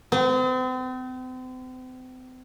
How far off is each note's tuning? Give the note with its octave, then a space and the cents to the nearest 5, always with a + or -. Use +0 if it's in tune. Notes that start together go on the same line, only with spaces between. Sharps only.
C4 -40